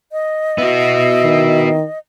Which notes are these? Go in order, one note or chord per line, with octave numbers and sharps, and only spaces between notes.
D#5
B3 E4 F#4
D#3